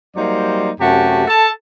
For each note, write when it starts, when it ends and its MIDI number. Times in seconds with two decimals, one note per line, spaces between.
0.16 0.70 54
0.16 0.70 55
0.16 0.70 58
0.16 0.70 63
0.16 0.70 72
0.16 0.70 74
0.80 1.26 42
0.80 1.26 48
0.80 1.26 57
0.80 1.26 66
0.80 1.26 67
0.80 1.26 81
1.28 1.49 69
1.28 1.49 81